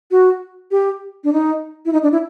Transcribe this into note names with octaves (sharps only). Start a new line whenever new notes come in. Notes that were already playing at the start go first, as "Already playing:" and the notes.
F#4
G4
D4
D#4
E4
D#4
D4
E4